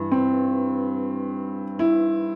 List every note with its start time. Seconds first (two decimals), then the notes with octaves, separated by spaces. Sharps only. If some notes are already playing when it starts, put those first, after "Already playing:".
Already playing: G2 E3
0.12 C4
1.79 E4